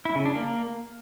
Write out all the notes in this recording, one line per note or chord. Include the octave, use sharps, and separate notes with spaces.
E4
C#3
D4
A#3